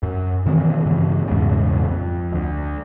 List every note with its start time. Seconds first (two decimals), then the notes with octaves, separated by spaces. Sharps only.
0.03 F#2
0.46 B2 D#3 E3 C4
0.86 G2 C#3 E3
1.28 A#1 E2 G#2 C#3
1.88 F2
2.33 D2